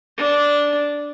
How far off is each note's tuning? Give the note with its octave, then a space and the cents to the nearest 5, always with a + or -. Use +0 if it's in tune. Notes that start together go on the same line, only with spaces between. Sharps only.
D4 -10